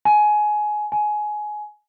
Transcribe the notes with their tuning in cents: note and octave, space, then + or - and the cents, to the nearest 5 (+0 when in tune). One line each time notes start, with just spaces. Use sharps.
G#5 +20
G#5 +20